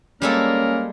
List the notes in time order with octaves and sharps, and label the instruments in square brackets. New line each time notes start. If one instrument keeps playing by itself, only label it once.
[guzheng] G3 G#3 A4 [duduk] A#3 [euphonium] C#4 [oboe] A#4